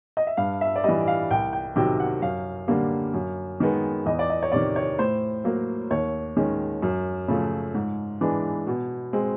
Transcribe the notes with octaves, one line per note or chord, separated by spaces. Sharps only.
D#5
E5
G2 F5
E5
D5
E3 G3 D#5
F5
C2 G5
G5
C3 D#3 F#3 G5
F#5
F#2 F5
D3 G3 A#3
F#2
D#3 G#3 B3
E2 D#5
D5
D#5
C#5
C3 D#3 D5
C#5
A2 C5
F#3 A#3
D#2 C#5
D#3 G#3 C#4
F#2
C#3 F3 A3
G#2
E3 G#3 B3 D4
B2
G#3 C4